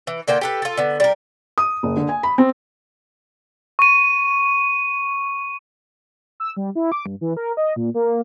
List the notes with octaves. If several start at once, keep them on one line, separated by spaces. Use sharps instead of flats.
E3
D3 A#3 F4 G5
G4 A4 B4
F4 A4
D3 B3
G3 A#4
D#6
F#1
D3
G#5
B5
C4
C#6 D#7
E6
G3
E4
D6
G2
E3
A#4
D#5
A#2
A#3